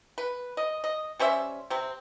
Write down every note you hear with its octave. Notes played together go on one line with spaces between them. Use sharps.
B4
D#5
D#5
G3 C#4 C5 E5
C3 C4